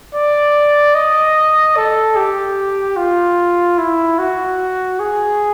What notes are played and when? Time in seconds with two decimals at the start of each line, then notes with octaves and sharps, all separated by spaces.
0.15 D5
0.95 D#5
1.76 A4
2.16 G4
2.97 F4
3.78 E4
4.19 F#4
5.00 G#4